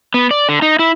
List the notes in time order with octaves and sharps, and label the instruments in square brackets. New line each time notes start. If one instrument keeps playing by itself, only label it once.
[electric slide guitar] B3
D5
D3
D#4
E4